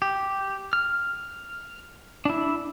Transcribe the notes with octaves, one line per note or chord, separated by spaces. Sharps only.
G4
F6
D4 E4